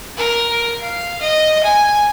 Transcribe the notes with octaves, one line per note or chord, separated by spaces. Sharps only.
A#4
F5
D#5
G#5